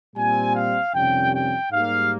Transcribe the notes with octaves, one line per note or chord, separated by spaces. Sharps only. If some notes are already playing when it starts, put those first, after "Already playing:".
A#2 G3 C4 G#5
F5
F2 C3 D#3 G3 C#4 G5
G5
G#2 G3 A#3 F5